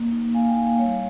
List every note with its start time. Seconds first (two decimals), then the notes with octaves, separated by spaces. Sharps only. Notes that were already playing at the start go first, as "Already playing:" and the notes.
Already playing: A#3
0.11 D#4
0.34 A#3 F5 G#5
0.48 G5
0.57 D#4 F5 G#5
0.79 G3 C#5 F5